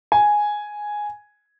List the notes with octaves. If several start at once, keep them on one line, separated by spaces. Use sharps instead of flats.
G#5